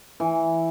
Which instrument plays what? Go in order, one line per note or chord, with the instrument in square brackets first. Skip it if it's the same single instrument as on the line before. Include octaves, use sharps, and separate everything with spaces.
[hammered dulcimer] E3